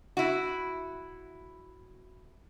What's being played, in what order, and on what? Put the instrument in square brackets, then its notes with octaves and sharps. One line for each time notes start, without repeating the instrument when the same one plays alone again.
[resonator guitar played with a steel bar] E4 F#4